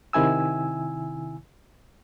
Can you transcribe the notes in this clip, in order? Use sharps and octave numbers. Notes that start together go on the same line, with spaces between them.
C3 D#3 E4 G#5 E6